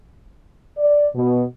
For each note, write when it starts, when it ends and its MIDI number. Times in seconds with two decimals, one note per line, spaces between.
0.78 1.08 74
1.15 1.44 47